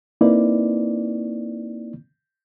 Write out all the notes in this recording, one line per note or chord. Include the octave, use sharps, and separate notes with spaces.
A#3 C4 D#4 E4 B4 D5